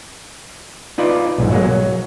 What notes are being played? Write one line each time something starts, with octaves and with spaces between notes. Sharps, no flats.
D#4 F4 B4 D5
B1 G#2
F#3 G#3 A#3
F#3